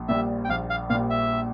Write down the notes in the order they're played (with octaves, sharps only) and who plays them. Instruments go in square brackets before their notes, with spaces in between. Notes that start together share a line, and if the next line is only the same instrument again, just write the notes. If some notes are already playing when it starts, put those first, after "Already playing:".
Already playing: [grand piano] A#1
[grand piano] A#2 G3 [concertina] E5
[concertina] G5
[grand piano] A#1 [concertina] F5
[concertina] F5
[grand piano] A#2 [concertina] F5
[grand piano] G3
[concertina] E5